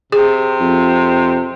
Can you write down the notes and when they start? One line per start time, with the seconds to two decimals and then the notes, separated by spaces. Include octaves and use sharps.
0.12 C3 G#4
0.60 F2